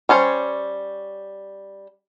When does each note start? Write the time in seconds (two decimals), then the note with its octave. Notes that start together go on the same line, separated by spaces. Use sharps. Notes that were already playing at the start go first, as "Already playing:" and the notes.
0.09 G3 C#4 C5 C#5